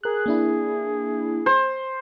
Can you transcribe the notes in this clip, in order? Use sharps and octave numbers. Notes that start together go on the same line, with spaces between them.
G#4 A#4 F#6
A#3 D4 E4
C5